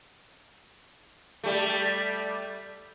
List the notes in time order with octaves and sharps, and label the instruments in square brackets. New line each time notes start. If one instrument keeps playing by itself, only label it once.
[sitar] G3 A3